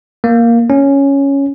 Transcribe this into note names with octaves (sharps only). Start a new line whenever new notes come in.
A#3
C#4